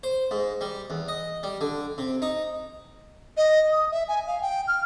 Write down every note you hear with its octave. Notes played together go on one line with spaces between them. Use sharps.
C5
G#2
G3
E2
D#5
G3
D3
C3
D#4
D#5
D#6
E5
G#5
F5
G5
F6